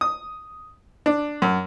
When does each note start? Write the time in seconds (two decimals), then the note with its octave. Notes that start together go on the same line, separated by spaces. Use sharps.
0.01 D#6
1.06 D4
1.42 F#2